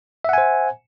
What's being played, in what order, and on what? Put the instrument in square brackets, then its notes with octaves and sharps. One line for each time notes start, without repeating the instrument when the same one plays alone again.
[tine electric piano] E5
F#5
G#5
C5